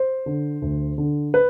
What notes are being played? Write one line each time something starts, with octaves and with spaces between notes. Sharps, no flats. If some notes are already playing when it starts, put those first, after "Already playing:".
Already playing: C5
D3
D2
D3
B4